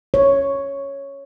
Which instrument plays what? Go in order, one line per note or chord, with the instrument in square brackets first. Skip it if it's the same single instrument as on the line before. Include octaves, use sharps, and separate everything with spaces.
[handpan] C#5